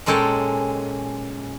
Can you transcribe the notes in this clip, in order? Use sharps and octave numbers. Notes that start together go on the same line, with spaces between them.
A#2 G#3 C#4 A4 G5 A5